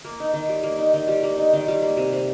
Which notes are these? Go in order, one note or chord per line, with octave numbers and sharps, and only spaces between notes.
A#3
D#4
D#3
G3
A#3
D#4
D#3
G3
A#3
D#4
D#3
G3
A#3
C3
C3